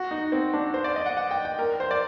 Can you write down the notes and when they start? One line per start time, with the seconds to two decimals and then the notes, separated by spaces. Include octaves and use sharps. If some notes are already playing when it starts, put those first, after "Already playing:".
Already playing: F#4
0.11 D#4
0.32 C4
0.53 D4
0.74 C5
0.84 D5
0.96 D#5
1.06 F#5
1.17 F#5
1.31 G5
1.45 G5
1.59 A#4
1.80 C5
1.91 D5